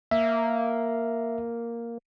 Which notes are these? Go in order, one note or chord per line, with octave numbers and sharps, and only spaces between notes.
A#3 E5